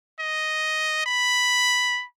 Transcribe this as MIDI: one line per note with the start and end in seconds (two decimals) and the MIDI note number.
0.20 1.04 75
1.06 2.05 83